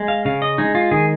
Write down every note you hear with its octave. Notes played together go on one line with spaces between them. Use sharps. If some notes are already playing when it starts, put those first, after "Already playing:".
Already playing: G#3
F5
C#3 F5
D#5
G#3 D#4
F4
D#3 G#4